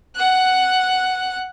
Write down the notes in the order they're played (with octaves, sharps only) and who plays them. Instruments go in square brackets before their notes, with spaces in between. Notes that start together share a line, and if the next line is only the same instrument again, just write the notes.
[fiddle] F#5 F#6